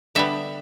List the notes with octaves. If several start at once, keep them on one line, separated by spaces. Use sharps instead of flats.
D3 G3 B3 E5